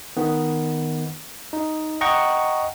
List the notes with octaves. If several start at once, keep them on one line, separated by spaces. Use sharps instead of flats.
D#3 B3
D#4
D#5 F#5 G5 A#5 C#6